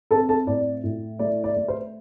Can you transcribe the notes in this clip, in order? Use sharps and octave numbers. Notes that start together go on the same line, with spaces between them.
C4 A4 A5
A4 A5
A2 D5
A2
A3 D5
D5
A3
C5